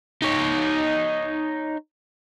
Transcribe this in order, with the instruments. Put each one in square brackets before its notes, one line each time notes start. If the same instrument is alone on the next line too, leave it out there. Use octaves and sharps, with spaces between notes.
[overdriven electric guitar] D#4 C#5